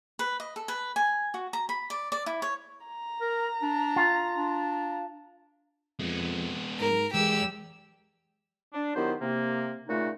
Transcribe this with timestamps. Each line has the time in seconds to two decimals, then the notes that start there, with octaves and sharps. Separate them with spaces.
0.19 B4
0.40 D#5
0.56 A4
0.68 B4
0.96 G#5
1.34 F#4
1.53 A#5
1.69 B5
1.90 D5
2.12 D5
2.26 E4
2.42 C#5
2.87 A#5
3.21 A#4
3.62 D4
3.96 F4
4.36 D4
6.00 F2 G#3 B3
6.80 G#2 A#4
7.14 E2 G#3 G4 E6
8.74 D4
8.95 D#3 F#3 B3 E4 G4 C5
9.21 C3 A#3
9.88 A#2 C#3 A3 D#4 F4 F#4